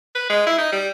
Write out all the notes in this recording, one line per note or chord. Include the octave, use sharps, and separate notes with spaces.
B4
G#3
E4
D#4
G3